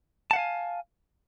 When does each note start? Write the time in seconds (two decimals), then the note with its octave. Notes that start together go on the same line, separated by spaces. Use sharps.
0.31 A5
0.33 F#5
0.36 F5
0.39 G#5